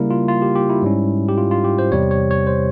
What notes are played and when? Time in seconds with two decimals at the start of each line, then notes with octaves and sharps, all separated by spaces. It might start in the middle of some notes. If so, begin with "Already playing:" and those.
Already playing: C#3 G3 A#3 E4 A#4
0.10 F4
0.28 F4
0.42 G4
0.56 G4
0.69 E4
0.82 G#2 G3 C#4
1.28 G4
1.38 F4
1.51 F4
1.64 G4
1.78 C5
1.92 E2 C3 G3 C4 C#5
2.11 C#5
2.31 C#5
2.47 C5